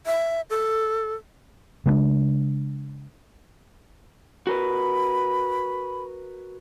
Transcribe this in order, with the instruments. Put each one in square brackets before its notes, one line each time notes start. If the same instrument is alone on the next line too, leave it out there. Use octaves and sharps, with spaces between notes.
[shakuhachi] E5
A4
[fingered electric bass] C#3 G#3 B3 D4
[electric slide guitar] F#4 A#4 B4 [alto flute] B5